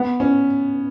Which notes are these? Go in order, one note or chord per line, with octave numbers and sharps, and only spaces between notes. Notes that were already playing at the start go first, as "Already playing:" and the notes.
Already playing: B3
C#4